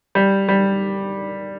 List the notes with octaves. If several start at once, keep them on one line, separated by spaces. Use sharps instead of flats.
G3
G3